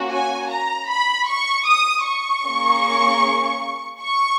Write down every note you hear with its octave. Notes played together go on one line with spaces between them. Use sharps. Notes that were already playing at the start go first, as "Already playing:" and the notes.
Already playing: A#3 C#4 F#4
G#5
A#5
B5
C#6
D#6
C#6
A#3 C#4 G#4
C#6